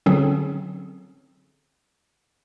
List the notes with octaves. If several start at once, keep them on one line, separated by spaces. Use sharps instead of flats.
D3 F#3 C4 C#4 G#4 A4